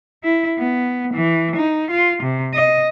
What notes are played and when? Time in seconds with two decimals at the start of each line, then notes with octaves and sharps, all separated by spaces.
0.24 E4
0.58 B3
1.13 E3
1.56 D#4
1.90 F4
2.22 C3
2.54 D#5